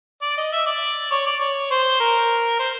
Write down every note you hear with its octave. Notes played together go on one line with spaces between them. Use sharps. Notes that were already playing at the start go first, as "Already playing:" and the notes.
D5
D#5
E5
D5
C#5
D5
C#5
C5
A#4
C5